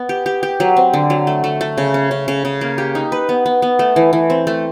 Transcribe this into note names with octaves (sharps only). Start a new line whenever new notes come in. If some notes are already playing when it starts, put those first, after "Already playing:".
Already playing: B3
G4
G4
G4
F#3
C4
D3
F#3
A3
A3
A3
C#3
C#4
C#3
C#3
C#3
A#3
G4
D#4
B4
B3
B3
B3
A3
E3
E3
C4
A3